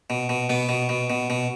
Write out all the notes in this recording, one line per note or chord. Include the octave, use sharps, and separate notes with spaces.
B2
B2
B2 B3
B2
B2
B2
B2